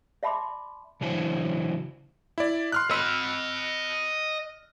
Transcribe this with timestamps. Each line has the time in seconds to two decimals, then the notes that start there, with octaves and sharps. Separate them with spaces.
0.23 D5 E5 A5 B5 C6 D6
1.01 C#3 E3 F#3 D4 E4 C5
2.38 E4 D5
2.72 C6 F6 F#6
2.91 D#5 B5 E6